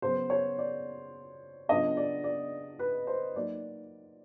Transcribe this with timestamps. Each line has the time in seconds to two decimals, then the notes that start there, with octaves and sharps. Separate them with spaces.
0.02 C#3 F#3 B3 C5
0.30 C#5
0.58 D5
1.68 C#3 F#3 B3 D4 F4 D#5
1.97 D5
2.24 D5
2.79 B4
3.07 C5
3.36 F#3 A#3 D#4 D5